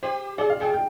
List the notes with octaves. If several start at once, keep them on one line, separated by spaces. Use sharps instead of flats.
G4 C5
G#4 D5
F5
G#4 G5
G5